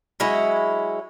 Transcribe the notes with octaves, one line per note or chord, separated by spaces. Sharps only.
F#3 G#3 C#4 E4